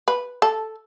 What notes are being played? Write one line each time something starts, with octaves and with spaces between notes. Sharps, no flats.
B4
A4